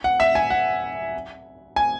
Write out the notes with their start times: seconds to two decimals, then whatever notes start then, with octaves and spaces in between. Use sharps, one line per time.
0.04 F#5
0.20 E5
0.35 G#5
0.50 F#5
1.76 G#5